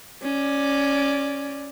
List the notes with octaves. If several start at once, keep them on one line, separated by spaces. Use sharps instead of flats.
C#4 D5